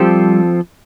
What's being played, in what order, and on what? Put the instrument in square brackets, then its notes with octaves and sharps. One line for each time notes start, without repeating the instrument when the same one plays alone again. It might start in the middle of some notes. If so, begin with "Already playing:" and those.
Already playing: [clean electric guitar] F3 C4 F4 A4 [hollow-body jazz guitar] G3 G4